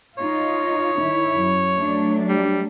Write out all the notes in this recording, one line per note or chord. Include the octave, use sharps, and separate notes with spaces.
D#4 F4 C#5
D#3 E4
F#2
F#3 A3 D4
G3